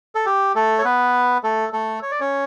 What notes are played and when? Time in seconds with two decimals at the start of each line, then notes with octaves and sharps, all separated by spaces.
0.15 A4
0.26 G4
0.55 A3 A4
0.79 C#5
0.85 B3 B4
1.44 A3 A4
1.73 A3 A4
2.02 C#5
2.11 D5
2.20 C#4 C#5